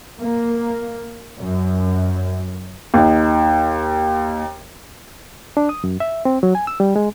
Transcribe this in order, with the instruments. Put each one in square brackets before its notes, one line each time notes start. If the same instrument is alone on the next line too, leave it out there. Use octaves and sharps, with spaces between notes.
[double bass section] A#3
F#2
[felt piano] D#2 D#4
[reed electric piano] D4
D#6
F#2
E5
C4
F#3
G#5
E6
G3
G#3